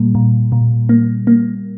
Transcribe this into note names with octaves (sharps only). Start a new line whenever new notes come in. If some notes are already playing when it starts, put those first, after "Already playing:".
Already playing: A#2 G3 A#3
A#2
A#2
A#3
A#3